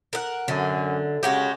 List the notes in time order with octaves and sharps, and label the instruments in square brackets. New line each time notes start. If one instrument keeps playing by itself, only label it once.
[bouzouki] A#4 F#5
[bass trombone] F#2 [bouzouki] D3
[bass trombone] C#3 [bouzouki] G#3 F#4 G4